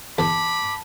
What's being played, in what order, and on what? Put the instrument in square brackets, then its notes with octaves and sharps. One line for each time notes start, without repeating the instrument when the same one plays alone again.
[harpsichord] E2 [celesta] A5 [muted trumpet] B5 [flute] D6